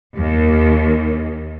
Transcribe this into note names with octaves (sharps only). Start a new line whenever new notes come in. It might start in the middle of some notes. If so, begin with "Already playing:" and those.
D#2